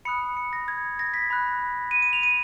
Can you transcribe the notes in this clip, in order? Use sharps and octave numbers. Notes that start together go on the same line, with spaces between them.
B5 D#6 F#6 C#7
C#7
A#6
G#6
A#6
B6
B5 F#6
D#7
D#7
F7
D#7